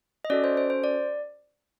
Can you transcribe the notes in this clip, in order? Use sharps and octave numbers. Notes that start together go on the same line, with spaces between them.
D#5
C#4 F#4 A4 D5
C5
C5
C5
D5